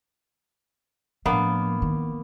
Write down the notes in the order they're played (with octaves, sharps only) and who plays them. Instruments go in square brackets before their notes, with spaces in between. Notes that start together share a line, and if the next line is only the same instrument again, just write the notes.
[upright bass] A2 F3 [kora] A#3 B3 D4
[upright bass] D#3